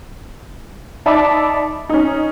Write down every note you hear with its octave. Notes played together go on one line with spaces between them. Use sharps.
D#4 D5 E5 A5 B5 D6
C#4 D#4